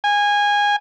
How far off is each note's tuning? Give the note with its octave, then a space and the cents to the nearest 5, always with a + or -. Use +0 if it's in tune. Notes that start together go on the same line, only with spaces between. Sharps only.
G#5 -20